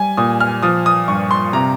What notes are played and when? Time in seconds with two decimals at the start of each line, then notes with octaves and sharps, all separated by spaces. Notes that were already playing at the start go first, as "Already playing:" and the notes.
Already playing: G3 G#5
0.17 A#2 D#6
0.40 F6
0.63 F3 D#6
0.86 D#6
1.08 G2 C#6
1.31 C6
1.53 C3 A#5